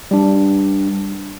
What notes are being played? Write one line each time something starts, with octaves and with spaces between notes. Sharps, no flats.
G3 D4